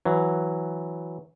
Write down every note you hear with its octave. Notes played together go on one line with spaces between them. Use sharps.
E3 F#3